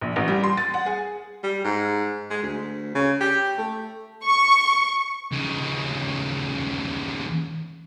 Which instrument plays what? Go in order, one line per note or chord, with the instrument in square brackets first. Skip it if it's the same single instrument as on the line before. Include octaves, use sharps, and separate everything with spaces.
[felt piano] A#1
A1
G3
C6
A6
F#5
G#4
[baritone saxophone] G3
G#2
G#3
D2
C#3
G4
A3
[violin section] C#6
[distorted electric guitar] D#2 C#3